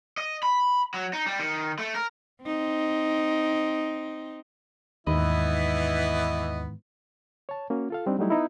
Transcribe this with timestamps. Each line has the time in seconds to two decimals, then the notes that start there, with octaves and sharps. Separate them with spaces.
0.18 D#5
0.43 B5
0.94 F#3
1.13 D#4
1.26 G3
1.40 D#3
1.79 A3
1.95 A#4
2.44 C4 D#4
5.07 D#2 G#2 D#3 E3 B3 E4 D#5 B5
7.49 C#5 A5
7.70 A#3 C#4 F#4
7.90 F4 A4 F5
8.06 G3 C4 D4 D#4
8.19 F#3 G3 A3 D#4 E4
8.30 B3 D#4 E4